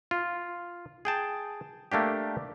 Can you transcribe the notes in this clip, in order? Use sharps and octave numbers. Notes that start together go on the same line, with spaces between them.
F4
G#4 G5 A5
A3 A#3 D4 G4